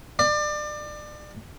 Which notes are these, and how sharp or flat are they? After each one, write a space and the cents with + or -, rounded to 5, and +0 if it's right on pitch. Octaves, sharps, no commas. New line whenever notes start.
D5 +30